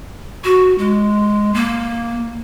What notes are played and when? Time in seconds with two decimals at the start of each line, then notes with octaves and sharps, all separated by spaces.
0.44 F#4
0.78 G#3
1.54 A#3